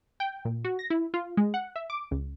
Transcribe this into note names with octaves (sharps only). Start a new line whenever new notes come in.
G5
A#2
F#4
A#6
E4
F4
G#3
F#5
E5
D6
C#2